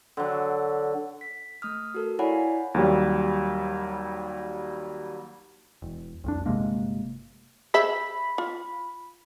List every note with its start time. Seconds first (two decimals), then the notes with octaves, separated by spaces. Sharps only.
0.17 D3 F#3
1.21 B6
1.62 A3 D#6 F6
1.94 F#4 A4 A#4
2.19 E4 C#5 D5 F#5 G#5 B5
2.32 F5
2.74 D#2 F#3 G3
5.82 E1
6.24 C2 F2 D4
6.46 G1 C3 G#3 A#3
7.74 G#4 C5 E5 B5
8.38 F4